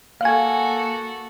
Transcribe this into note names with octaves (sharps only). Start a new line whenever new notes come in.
A#3 F#4 A4 F5 G#5